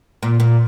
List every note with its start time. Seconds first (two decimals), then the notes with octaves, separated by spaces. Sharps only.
0.23 A#2
0.40 A#2